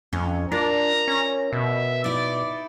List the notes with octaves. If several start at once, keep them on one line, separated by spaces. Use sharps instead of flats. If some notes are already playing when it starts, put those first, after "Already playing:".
F2 C#4
D4 F4 A#4 D5 A#5
C#4
B2 E5
D#4 E4 D5